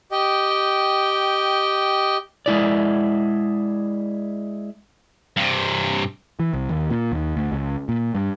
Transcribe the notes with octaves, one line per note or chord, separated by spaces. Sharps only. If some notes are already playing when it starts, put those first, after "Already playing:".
G4 D#5 G5
G#3 E4 D5
G2 C3
E3
C2
D#2
A#2
D#2
D2
C#2
A#2
G2